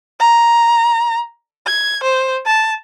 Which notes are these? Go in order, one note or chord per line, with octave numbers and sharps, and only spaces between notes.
A#5
G#6
C5
A5